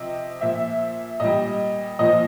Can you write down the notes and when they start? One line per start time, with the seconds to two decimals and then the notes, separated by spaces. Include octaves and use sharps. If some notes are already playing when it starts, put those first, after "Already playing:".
Already playing: C3 F3 D#5
0.41 A#2 F3 E5
1.20 A#2 G3 D#5
1.99 A#2 F3 D#5